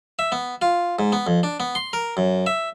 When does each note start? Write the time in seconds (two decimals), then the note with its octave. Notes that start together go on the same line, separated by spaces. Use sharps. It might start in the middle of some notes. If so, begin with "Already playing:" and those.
0.19 E5
0.32 B3
0.62 F4
0.99 G#2
1.12 B3
1.27 F2
1.43 D4
1.60 B3
1.75 C6
1.93 A#4
2.17 F#2
2.46 E5